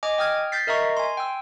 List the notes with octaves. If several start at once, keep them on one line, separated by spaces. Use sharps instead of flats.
D#5 G#5 D6
G5 D#6 F6 G#6
G6 A6 B6 C7
A#4 D#5 E5 A#5 C#6
G#5 C6
G5 E6